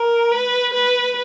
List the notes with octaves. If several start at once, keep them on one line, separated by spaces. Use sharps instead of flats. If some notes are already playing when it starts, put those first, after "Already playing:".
Already playing: A#4
B4
B4